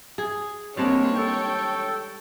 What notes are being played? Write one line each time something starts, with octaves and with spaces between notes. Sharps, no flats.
G#4
G3 G#3 A#3 C4 D4 C#5
A4 G5